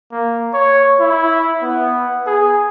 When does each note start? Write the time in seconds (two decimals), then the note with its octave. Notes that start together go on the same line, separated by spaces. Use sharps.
0.12 A#3
0.53 C#5
1.00 E4
1.62 B3
2.27 G#4